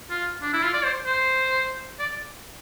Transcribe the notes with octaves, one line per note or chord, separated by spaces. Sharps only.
F4
D4
E4
F4
D5
C5
C5
D5